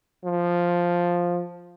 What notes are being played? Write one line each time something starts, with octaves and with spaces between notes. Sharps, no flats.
F3